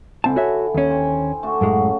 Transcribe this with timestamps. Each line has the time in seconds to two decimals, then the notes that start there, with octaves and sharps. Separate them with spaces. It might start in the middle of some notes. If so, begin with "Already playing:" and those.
0.24 C#2 D3 C4 E4 G#5 A5
0.36 F#4 C#5 E5
0.74 D#2 C#4
0.89 C5 G5 G#5
1.43 A3 D4 F#4
1.61 F#2 A2 C#3 F#3 G#3